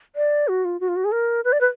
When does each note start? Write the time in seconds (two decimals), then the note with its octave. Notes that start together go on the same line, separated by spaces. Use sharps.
0.16 D5
0.48 F#4
0.65 F4
0.80 F#4
0.88 F4
0.96 F#4
1.05 G#4
1.12 A#4
1.45 B4
1.53 D5
1.61 B4